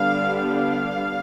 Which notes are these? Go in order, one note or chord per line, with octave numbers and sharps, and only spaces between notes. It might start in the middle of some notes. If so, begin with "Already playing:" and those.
Already playing: D3 G3 B3 D4 F5
F5